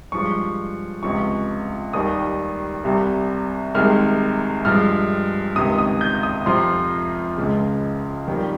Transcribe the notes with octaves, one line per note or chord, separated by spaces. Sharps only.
G2 F3 G#3 C#6
C#2 C3 F3 C#6
D#2 D#3 G3 D#6
C2 C3 G3
C2 C3 D#3 G#3 F6
G2 F3 G#3 F6
C#2 C3 D#3 D#6
D#6
G6
D#6
F2 C3 F3 C6
C#2 C#3 G#3
F2 D#3 G3